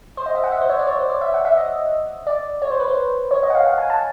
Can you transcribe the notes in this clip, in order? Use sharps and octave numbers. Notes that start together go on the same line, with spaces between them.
C5
D#5
E5
F#5
E5
C5
C#5
D5
C#5
C5
D5
E5
F#5
E5
D#5
D5
C#5
C5
B4
C5
C#5
D#5
F#5
F5
F#5
G#5
A5